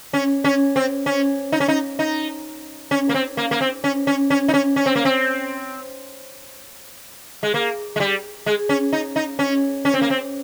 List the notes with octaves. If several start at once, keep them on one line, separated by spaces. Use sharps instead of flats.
C#4
C#4
C4
C#4
D#4
C#4
D#4
D#4
C#4
A#3
C4
A#3
A#3
C4
C#4
C#4
C#4
D#4
C#4
C#4
C4
A#3
C4
G#3
A#3
G#3
G3
G#3
C#4
D#4
D#4
C#4
C#4
C4
A#3
C4